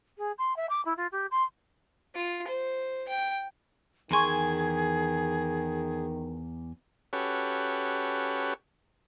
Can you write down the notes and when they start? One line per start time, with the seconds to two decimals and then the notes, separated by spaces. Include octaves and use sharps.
0.17 G#4
0.38 C6
0.56 E5
0.69 D6
0.85 E4
0.97 F4
1.11 G4
1.31 C6
2.14 F4
2.47 C5
3.09 G5
4.11 E2 D#3 G#4 G#5 A#5 C6 C#6
7.13 C#4 F#4 G4 A4 B4 C#5